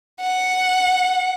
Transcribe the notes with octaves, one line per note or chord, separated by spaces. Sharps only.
F#5